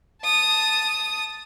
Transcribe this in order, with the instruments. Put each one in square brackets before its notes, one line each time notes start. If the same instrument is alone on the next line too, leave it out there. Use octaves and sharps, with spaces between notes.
[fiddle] A5 D#6